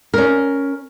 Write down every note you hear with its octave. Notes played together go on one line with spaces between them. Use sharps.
C#4 A#4